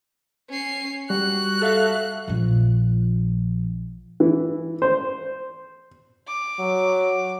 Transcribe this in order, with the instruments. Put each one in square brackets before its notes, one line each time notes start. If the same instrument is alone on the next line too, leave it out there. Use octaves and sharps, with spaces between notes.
[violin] C#4 C7
[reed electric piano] G3 [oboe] F#4 [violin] F#6
[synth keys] A4 E5 F5
[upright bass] A#1 F3
[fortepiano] E3
C5
[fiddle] D6
[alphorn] F#3